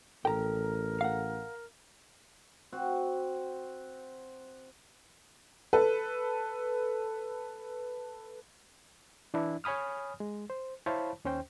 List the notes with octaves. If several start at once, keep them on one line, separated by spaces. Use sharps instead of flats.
A1 A4 A#4 G5 A#5
F5 F#5
C4 F#4
A4 B4
E3 D4 E4
C#5 G#5 B5 D#6 F6
G#3
C5
E4 C5 C#5 F5 A5 B5
D#2 C#4 C5 G5